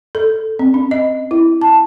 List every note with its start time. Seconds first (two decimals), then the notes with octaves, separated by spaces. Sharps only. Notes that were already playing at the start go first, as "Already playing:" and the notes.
0.15 A4
0.59 C4
0.74 C#4
0.91 D#5
1.31 E4
1.62 A5